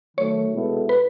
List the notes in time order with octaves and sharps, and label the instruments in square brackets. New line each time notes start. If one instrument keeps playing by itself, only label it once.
[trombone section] D#3 F#3 A3 [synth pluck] C#5
[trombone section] B2 G#3 B3 E4 A4
[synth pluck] B4